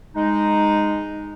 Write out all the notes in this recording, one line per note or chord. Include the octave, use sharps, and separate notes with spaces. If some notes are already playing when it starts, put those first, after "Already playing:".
G#3 D#4